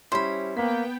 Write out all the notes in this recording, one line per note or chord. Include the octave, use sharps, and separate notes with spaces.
G3 C#4 E4 C5 B5
A#3 B3 G5 B6